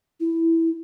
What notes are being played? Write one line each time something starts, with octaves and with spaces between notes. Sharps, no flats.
E4